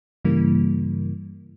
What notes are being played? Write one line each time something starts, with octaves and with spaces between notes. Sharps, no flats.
G2 C#3 E3 G3 A#3